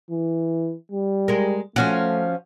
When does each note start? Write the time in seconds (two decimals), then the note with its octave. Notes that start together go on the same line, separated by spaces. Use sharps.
0.11 E3
0.92 G3
1.28 G#3 A#4
1.76 F3 A3 C#4 F#4